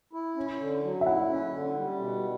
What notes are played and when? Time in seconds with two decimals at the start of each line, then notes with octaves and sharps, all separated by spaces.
0.13 E4
0.36 C#4
0.60 D3
0.84 F#3
1.01 E5
1.06 E4 F#5
1.30 C#4
1.53 D3
1.77 G3
1.99 B2